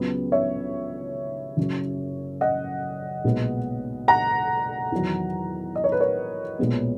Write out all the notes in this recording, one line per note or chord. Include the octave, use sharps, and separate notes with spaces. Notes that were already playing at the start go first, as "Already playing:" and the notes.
Already playing: C#2 C#3 F#3 B3
C#5 E5
F#1 F#2 C#3 F#3
D#5 F#5
B1 A#2 G#3 B3
F#5 A#5
E2 D#3 F#3
D#5
C#5
B4
A#4 C#5
B1 A#2 G#3 B3